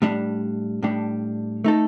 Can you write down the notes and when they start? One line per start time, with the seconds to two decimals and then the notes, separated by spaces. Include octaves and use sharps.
0.02 A2 G3 D4
0.83 A2 G3 D4
1.64 A3 D#4 A4